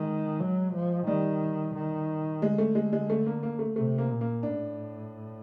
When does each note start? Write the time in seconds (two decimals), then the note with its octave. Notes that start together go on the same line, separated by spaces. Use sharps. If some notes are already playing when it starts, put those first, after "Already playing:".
Already playing: D#3 G#3
0.40 F#3
0.74 F3
1.07 D#3 G3
1.75 D#3
2.42 D3 G#3
2.58 A3
2.75 G#3
2.93 G#3
3.10 A3
3.26 A#3
3.43 A#3
3.59 A3
3.76 C3 A3
3.98 A#3
4.09 A#2
4.21 A#3
4.43 A2 D4